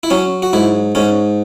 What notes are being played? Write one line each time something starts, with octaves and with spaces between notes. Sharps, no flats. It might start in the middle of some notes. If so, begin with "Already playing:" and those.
E4
F#3 C#4
F#4
G#2 E4
G#2 C#4